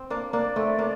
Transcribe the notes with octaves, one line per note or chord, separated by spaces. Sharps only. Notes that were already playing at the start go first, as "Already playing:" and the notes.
Already playing: C4
A#3 D4
A#3 D4 D5
A3 C4
A#3 D4